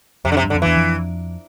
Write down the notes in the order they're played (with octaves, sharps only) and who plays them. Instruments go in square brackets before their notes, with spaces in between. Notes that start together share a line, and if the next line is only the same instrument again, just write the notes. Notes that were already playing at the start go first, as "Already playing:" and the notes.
[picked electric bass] F2 [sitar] C3
[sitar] D3
C3
[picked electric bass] G2
[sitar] D3
[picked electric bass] F2
[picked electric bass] E2 [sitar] E3
[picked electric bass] F2